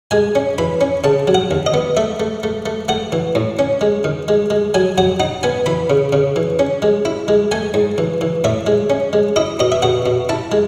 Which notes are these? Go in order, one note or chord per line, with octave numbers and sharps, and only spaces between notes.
G#3 G#5
C#4
E3 B5
C#4
C#3 A5
F#3
F#5
D#2
D#5
B3
A3 E5
A3
A3
A3
A3 F#5
E3
A2
C#4
G#3
D#3
G#3
G#3
F#3 G#5
F#3 F#5
D#4 F#5
B3 G#5
E3 B5
C#3
C#3
E3
C#4
G#3
E4
G#3
A3 G#5
G#2
E3
E3
A2 E5
G#3
C#4
G#3
E4 D#5
B2 D#5
E5
B2 F#5
B2
E4 A5
G#3